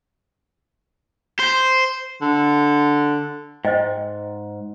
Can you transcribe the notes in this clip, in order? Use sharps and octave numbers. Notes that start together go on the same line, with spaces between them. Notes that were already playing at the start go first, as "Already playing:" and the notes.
C5
D3
G#2 C5 D#5 G5